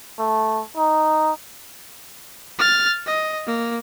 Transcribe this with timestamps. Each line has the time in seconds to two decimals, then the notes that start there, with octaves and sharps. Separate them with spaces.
0.19 A3
0.77 D#4
2.59 F6 A6
3.06 D#5
3.47 A#3